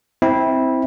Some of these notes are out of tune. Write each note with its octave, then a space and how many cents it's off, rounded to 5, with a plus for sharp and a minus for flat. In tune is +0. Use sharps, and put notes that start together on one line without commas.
C4 +0 E4 -20